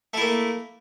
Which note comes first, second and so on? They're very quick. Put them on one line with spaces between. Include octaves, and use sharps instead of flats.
A3 E4 A#3